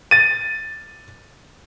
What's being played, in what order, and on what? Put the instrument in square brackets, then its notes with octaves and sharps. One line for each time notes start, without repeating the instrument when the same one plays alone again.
[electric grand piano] A6 D#7